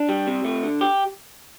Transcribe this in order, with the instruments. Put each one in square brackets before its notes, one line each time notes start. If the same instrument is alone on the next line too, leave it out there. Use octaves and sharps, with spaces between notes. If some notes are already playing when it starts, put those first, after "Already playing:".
Already playing: [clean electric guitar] D4
G3
C3
A3
D3
G4